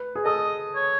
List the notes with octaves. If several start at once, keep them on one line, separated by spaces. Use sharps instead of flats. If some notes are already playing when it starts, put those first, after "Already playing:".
Already playing: B4
G#4
A4 D#5
C#5